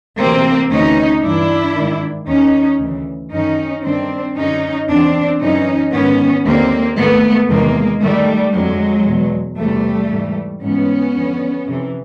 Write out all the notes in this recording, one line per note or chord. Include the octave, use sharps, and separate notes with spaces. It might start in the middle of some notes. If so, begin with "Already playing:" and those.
D2 C3 E3 A#3 C4
D2 C#3 E3 C#4 D#4
G2 E3 D4 E4
G#2 D#3
D#2 D#3 C#4 D#4
D2 C#3 E3
F#2 D#3 C#4 D#4
G2 D#3 C4 D4
F#2 D3 C#4 D#4
E2 C#3 E3 C4 D4
F#2 C#3 E3 C#4 D#4
G#2 D#3 B3 C#4
D#2 D3 A#3 C4
G#2 D#3 A3 B3
E2 C3 D#3 G#3 A#3
G#2 D#3 G3 A3
F2 D3 F#3 G#3
E2 B2
E2 C3 E3 G3 A3
G#2 E3
G#2 E3 B3 C#4
F2 D3
F2 C3 E3